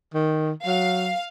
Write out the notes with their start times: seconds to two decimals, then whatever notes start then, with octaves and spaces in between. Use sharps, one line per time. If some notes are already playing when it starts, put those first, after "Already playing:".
0.14 D#3
0.66 F#3 F5